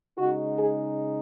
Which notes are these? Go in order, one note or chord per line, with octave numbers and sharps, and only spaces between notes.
C#3 G#3 D#4 F#4
G#4